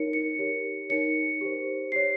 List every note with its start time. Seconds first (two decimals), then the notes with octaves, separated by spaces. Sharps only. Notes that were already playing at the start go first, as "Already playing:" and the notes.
Already playing: D#4 A#4 C#5 C#7
0.13 C#7
0.39 G4 A#4 C#5
0.89 D#4 A#4 C#5 C#7
1.41 G4 C5
1.92 G4 C#5 C7